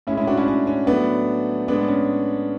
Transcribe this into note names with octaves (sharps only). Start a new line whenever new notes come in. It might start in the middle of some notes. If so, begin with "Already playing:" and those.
A2 G#3 C#4 E4
C#4 E4
D4 F#4
C#4 E4
C#4
C#4
A2 F#3 A3 B3 D4
A2 G#3 B3 D4
C#4